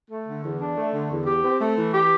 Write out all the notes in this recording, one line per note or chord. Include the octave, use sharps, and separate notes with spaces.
A3
D3
E2
D4
A3
D3
E2
G4
C4
A3
E3
G4